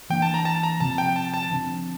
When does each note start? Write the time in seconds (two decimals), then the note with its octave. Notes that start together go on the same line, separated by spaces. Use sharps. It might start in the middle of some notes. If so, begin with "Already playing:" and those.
0.10 E3 A#3 D4 G5
0.22 A5
0.34 A#5
0.45 A5
0.63 A#5
0.80 C3 F3 C4 A5
0.98 G5
1.16 A5
1.34 A5
1.51 D3 F3 C4